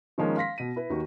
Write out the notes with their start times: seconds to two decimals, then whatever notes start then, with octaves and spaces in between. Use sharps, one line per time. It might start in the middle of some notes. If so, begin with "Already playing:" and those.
0.18 D#3 F3 G#3 A#3 C#4
0.37 F5 C6 A#6 B6
0.58 B2 D#7
0.76 E4 B4
0.90 D#2 D#3 F#4